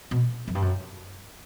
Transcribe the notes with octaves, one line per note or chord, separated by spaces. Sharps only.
B2
F#2
G2
F#2